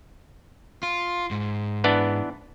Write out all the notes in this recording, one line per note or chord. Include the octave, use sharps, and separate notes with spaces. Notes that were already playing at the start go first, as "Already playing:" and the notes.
F4
G#2
E3 B3 D4